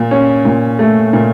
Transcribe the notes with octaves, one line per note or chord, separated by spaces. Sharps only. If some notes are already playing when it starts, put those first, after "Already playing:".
Already playing: A#2
C#4
A#2
A3
A#2